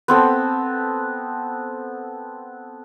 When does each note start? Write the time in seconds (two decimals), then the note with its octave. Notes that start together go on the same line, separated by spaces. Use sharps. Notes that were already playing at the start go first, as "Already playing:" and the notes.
0.08 B3 C4 A4